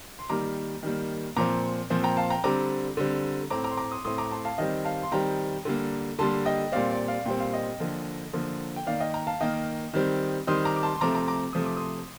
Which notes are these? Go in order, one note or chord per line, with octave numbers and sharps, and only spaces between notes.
C6
D#3 G3 A#3 A#5 D6
D#3 G3 A#3
A#2 F3 C4 A#5 D6
A#2 F3 C4
G5 A#5
F5 A5
G5 A#5
D3 G3 C4 A#5 D6
D3 G3 C4
A2 A3 C4 A#5 D6
A#5 D6
C6
A#5 D6
C6 D#6
A2 A3 C4 C6 D#6
A#5 D6
A5 C6
F5 A5
D#3 G3 C4 D#5 G5
F5 A5
C6
D#3 G3 C4 G5 A#5
D3 G3 A#3
D3 G3 A#3 A5 C6
D#5 G5
A#2 G3 C4 D5 F5
D5
D5 F5
A#2 G3 C4 G5
F5
D#5 G5
D3 F3 A#3
D3 F3 A#3
G5
D#3 A#3 D5 F5
D#5 G5
G5 A#5
F5 A5
D#3 A#3 D#5 G5
D#3 G3 C4
D#3 G3 C4 C6 D#6
A#5 D6
D6
A5 C6
C6
C3 F3 A3 C4 A#5 D6
A#5 D6
A#5 D6
C3 F3 A3 C4 D#6
D6
C6 D#6